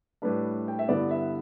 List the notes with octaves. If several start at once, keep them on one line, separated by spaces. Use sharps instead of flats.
A2 G3 D4 B4
G5
E5
G2 D3 B3 E4 D5
E5